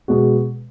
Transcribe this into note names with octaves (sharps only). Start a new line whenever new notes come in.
B2 G#3 B3 F#4